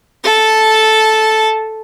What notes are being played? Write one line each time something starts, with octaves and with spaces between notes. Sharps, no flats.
A4 A5